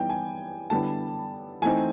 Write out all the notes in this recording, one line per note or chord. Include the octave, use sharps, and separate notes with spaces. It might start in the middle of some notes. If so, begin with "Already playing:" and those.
Already playing: E3 G3 B3 D#4 G5
G#5
D3 G3 B3 E4 A5
E3 A3 C4 D#4 G#5